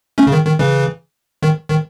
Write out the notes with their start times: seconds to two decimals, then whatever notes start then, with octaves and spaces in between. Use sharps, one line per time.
0.18 A3 C#4
0.27 C#3
0.32 D#3
0.46 D#3
0.59 C#3 E3
1.43 D#3
1.69 D#3